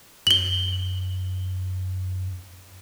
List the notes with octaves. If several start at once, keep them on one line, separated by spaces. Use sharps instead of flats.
F#2 F#7 G7